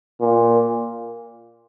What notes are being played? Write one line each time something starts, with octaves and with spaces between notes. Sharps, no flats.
A#2